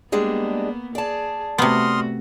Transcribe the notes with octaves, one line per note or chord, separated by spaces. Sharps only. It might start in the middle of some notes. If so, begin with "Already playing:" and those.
G3 G#3 A#3 B3 D4
G#4 D5 A5
C3 A3 B3 F#4 C6 D#6 F6